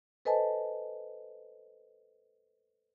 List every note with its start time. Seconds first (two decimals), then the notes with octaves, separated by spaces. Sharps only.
0.25 A4 B4 C5 D#5 G#5 A5